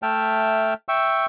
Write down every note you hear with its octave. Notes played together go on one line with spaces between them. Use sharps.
A3 E5 G5 A5 F6
E5 G5 C#6 E6